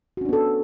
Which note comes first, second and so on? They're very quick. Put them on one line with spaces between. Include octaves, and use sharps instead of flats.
F#4 C#4 D4 B3 A4